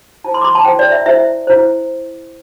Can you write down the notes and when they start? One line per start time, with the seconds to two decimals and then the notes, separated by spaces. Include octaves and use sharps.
0.24 E4 C5 A5
0.34 C6
0.41 D6
0.44 C6
0.55 A5
0.65 E4 C5 G5
0.79 D5
0.92 E5
1.06 E4 C5 E5
1.47 E4 C5